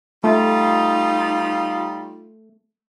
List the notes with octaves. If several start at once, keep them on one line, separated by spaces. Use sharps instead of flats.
G3 A3 D#4 F4